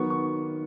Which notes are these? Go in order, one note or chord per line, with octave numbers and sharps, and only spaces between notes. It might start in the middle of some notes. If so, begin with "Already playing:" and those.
Already playing: D#3 F#3 B3 C#6
C#6